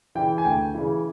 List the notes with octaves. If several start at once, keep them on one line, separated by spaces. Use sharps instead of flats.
C#3 E3 G5
G#5
D2 G5
C#3 E3